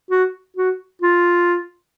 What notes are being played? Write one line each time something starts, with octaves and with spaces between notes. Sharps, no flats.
F#4
F#4
F4